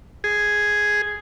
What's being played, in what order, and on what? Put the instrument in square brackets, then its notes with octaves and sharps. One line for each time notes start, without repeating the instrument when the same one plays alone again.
[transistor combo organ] G#4